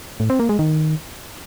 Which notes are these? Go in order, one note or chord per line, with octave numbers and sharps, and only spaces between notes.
A2
C4
A#3
G#3
D#3